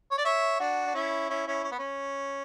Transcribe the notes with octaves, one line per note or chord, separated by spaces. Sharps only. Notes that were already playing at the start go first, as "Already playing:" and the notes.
C#5
D5
C#5 E5
D4 F#4
D4
C#4 E4
C#4 E4
C#4 E4
C#4
B3
C#4